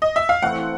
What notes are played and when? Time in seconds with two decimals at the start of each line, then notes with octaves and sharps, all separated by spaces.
0.02 D#5
0.16 E5
0.29 F5
0.42 E3 A3 C4 F#5